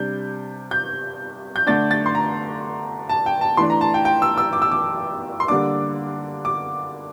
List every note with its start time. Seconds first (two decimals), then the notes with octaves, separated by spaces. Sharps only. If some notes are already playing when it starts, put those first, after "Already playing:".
Already playing: C3 G3 D4 G6
0.71 G6
1.56 G6
1.67 D3 A3 D4 A6
1.91 A6
2.06 C6
2.15 A#5
3.09 A5
3.26 G5
3.41 A5
3.57 E3 A3 D4 C6
3.70 A#5
3.81 A5
3.94 G5
4.05 G5
4.22 E6
4.38 E6
4.53 D6
4.62 E6
4.71 D6
5.40 C6
5.48 D3 G3 A#3 D4 D6
6.45 D6